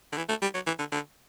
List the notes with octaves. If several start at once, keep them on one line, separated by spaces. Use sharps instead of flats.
D3
E3
A3
G3
F#3
E3
D3
D3